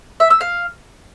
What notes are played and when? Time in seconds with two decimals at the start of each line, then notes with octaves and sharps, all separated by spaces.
0.20 E5
0.30 E6
0.41 F5